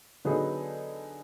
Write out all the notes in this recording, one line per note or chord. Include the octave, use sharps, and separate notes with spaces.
D3 F#3 B3 D#4 G#4